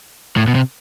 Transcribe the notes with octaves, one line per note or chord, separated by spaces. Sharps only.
A2
B2
C3